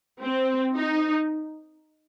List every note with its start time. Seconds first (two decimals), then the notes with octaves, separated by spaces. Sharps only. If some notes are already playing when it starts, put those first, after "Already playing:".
0.22 C4
0.75 D#4